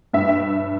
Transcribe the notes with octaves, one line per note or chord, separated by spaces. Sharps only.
G2 E5
E5